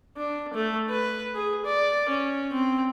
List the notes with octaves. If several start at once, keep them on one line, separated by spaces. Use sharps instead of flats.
D4
A3
B4
G#4
D5
C#4
C4